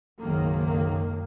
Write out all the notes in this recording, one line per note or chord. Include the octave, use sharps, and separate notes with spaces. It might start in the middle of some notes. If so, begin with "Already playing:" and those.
F#1 B1 G#2 D#3 A#3